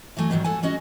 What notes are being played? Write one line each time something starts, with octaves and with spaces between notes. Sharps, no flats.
E3 F#3 A3 G#5
E2 G#2 D#3 F3 F#3
A4 F#5 G#5
G#3 C#4 F#4 D#5